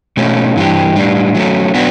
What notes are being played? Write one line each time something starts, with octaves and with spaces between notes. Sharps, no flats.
B2 A3 C#4
G2 E3 A3 D4 G4
A2 G3 D4
F#3 A3 C#4
F#3 B3 D4 F#4